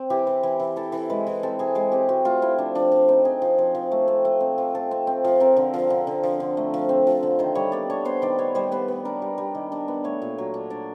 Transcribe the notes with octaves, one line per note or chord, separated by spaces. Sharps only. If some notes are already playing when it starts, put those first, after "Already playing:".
Already playing: C4
E3 G4
E3
E3
E3
E3 A4
E3
G#3 B4
E3
C4 A4
E3 G#4
G#3 G#4
C4 G4
C4 F#4
A3 F4
C4 E4
F3 D4
F3 D4
F3 D4
C4 D#4
C4 G#4
F3
F3
F3
A3
C4
A3
C4
F3
C4 A4
C4
C4
F3
C4 A#4
D3
F3
D3
D3
F3
D3
A3
F3
C4
F3
D3
D#3 C5
G3 C#5
B3 D5
D4 C#5
B3 C5
D#3 D5
B3 C#5
G3 C5
B3 B4
B3
D4 A#4
G3
G3
D#3
D4
B3
A3 C#5
A#2
F#3
D4
D4 D5